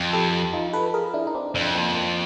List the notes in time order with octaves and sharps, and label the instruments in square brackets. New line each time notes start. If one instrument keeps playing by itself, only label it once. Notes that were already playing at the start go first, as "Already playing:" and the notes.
Already playing: [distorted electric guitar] F2
[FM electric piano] G4 A4
D#4 F4
A4 B4
G#4 A#4
D4 E4
D#4
C4 D4
[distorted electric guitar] F2 [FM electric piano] C4 D4
[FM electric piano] A#3 C4
A#3